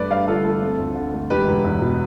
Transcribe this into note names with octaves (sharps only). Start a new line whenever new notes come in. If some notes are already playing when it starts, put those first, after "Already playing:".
Already playing: G2 A3 B4 D5
G2 D5 F5
D3 F4 A4
A3 F4 A4
C4
D2
D3
A3
E1 G4 B4
E1
E2
B2